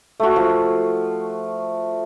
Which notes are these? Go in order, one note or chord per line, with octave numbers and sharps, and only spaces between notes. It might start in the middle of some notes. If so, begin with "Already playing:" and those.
A3 F#4
F3